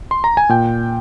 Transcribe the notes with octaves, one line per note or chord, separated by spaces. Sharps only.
C6
A#5
G#5
A#2 G5